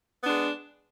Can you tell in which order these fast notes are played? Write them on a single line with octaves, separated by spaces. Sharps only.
B3 D4 G#3